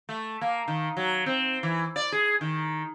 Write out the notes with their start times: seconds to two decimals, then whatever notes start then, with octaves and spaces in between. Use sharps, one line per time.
0.09 A3
0.41 A#3
0.68 D#3
0.97 F#3
1.26 C4
1.63 E3
1.96 D5
2.12 G#4
2.41 D#3